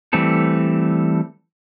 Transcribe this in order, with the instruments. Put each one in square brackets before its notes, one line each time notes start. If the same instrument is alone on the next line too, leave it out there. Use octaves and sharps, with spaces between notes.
[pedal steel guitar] E3 G3 A3 C4 A4